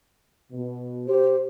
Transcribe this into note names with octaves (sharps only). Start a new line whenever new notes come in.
B2
G4 C5